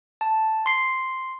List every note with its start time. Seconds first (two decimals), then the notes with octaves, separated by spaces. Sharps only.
0.21 A5
0.66 C6 C7